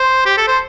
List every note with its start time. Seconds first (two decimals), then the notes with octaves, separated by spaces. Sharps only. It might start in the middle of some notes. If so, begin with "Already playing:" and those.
Already playing: C5
0.26 G4
0.37 A4
0.48 C5